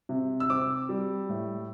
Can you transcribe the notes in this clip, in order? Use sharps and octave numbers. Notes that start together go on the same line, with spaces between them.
C3
E6
C4 D6
G3
A2